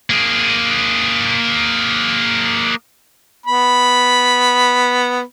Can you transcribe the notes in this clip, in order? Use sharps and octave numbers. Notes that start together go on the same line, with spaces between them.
A#3 G#4
B3 B5